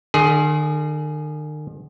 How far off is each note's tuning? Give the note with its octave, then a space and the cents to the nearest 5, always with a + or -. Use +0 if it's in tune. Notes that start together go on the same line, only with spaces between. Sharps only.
D#3 -45 G#4 +15